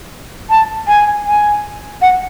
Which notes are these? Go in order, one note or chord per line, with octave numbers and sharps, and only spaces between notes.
A5
G#5
G#5
F#5